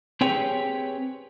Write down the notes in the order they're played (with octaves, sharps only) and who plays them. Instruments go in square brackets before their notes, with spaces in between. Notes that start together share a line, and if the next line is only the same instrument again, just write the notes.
[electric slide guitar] C4 G4 G#4 B4 C#5 G5